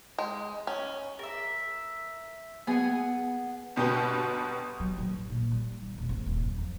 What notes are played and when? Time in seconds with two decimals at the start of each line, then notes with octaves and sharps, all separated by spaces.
0.18 G#3
0.67 C#4
1.19 A#4 E5
2.67 B3 G#4 F#5 G#5
3.76 G1 B2 G4 B4 G6
4.80 F#3
4.98 A1
5.13 G2
5.30 A#2
5.51 G3
5.82 D#3
5.98 D#1
6.09 G#1
6.26 D#1
6.43 F#2
6.58 F2